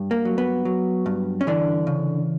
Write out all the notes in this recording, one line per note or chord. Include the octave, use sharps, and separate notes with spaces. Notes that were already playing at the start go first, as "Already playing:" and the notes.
Already playing: G2
A#3
F#3
B3
F#3
G2
C#4
D3 E3 D4
C#3